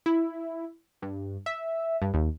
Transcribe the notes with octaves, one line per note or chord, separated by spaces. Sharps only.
E4
G2
E5
G2
D#2